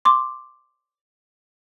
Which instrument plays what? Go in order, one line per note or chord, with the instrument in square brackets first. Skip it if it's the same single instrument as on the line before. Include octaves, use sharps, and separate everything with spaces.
[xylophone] C6 D6